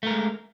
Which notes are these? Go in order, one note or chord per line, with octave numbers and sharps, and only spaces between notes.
G#3 A3 A#4